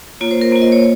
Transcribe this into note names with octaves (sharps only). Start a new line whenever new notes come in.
A#3 F4 C#5
C5
A#4
A#3 F4 C5
D#5
C#5